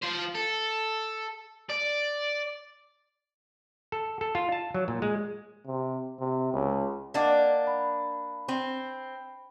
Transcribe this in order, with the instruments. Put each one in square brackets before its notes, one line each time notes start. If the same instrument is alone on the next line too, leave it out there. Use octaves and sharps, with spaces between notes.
[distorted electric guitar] F3 C5
A4
D5
[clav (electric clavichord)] A4
A4
F4
A5
F#3
A#2
G#3
[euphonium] C3
C3
C#2
[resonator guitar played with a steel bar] A#3 D4 [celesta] D#5 F#5 D6
[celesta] B5
[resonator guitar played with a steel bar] C4